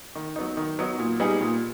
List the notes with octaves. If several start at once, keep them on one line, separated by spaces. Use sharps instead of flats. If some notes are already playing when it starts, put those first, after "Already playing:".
D#3
F#3 B3 D#4
D#3
F#3 B3 D#4
A#2
G3 B3 D#4 G#4
A#2